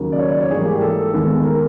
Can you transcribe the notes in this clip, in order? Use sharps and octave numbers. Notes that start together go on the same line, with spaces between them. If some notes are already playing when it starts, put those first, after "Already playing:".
Already playing: D#2 C#3 F#3 A#3
D5
C#5
D5
C#5
G#2 E3 G3 A#3 G#4
G4
A4
D#2 D#3 G#3 B3
A#4